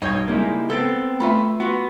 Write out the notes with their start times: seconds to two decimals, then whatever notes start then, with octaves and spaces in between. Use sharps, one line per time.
0.02 B1 G2 C#5 D#5 G6 G#6
0.28 C#2 G3 G#3 A#3 D#4 E4
0.70 B3 C4 A4 E6 A6 D7
1.20 A3 F4 B4 E5 B5
1.60 B3 F4 F#4 C#6